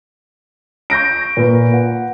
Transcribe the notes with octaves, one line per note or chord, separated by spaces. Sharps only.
C#6 G6 A#6 D7
A#2 B4
F#5